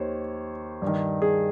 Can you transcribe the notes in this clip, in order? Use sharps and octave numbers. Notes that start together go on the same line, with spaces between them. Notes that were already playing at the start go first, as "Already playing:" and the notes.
Already playing: D#2 D#3 C5 C#5
G2
D#3
G#4